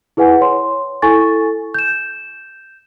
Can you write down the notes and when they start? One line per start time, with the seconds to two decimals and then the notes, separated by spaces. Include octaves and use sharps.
0.17 E4 G#4 B4 F#5 G#5
0.41 C#5 C6
1.02 E4 A4 G#5 C#6 A6
1.74 G6 E7